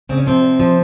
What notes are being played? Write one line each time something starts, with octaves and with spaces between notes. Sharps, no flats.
C#3 C4
C#4
C3 F3 C4
F3
F3